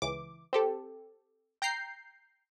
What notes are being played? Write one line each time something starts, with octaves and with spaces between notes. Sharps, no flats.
C#2 E3 D6
C4 G4 A4
G5 A#5 G6 C7